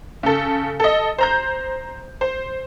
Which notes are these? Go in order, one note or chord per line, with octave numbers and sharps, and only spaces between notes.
C#3 A4
A4 D#5
C5 A#5 G6
C5